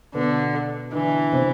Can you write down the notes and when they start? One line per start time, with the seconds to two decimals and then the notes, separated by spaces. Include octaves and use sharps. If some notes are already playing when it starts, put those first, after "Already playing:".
0.14 B2 D3 B3
0.93 D3 E3 D4
1.33 C3 C4